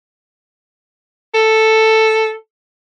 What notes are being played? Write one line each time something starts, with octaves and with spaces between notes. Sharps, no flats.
A4